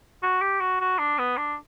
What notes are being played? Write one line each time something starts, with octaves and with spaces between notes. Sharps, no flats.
F#4
G4
F#4
F#4
D4
B3
D4